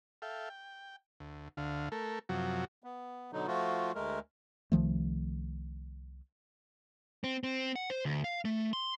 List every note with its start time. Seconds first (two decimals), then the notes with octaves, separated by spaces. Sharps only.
0.22 A4 E5 F5 G5
0.50 G5
1.20 D2
1.57 D2 D3 F5
1.92 A3 A4 A#4
2.29 F#2 C3 F3 F#3 F#4
2.84 B3
3.33 B2 D3 F#3 D#4
3.47 F3 A3 F4 F#4
3.95 D2 G#3 A3 A#4
4.72 C2 D#3 F3 A3
7.24 C4
7.44 C4
7.76 F#5
7.90 C5
8.05 D2
8.24 F5
8.45 A3
8.73 C6